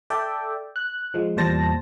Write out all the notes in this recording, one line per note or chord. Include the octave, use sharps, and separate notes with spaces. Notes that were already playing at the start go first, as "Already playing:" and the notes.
A4 D5 E5 G5
F#6
F3 G#3
E2 A#2 G3 C5 A5 A#6